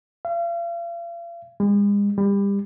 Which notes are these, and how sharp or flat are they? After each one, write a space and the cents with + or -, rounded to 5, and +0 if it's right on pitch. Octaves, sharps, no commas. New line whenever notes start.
F5 -40
G#3 -40
G3 +30